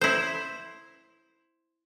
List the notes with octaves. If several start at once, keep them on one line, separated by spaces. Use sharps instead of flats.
E4 C5